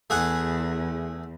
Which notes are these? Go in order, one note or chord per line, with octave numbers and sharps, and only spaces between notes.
E2 A3 G#4 F#5